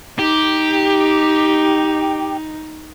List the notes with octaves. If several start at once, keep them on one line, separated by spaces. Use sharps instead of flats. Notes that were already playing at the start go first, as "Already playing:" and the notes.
D#4 G4